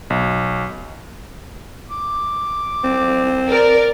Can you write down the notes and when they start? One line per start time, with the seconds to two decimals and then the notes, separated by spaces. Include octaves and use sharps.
0.10 B1
1.91 D6
2.84 C4
3.49 A#4 D5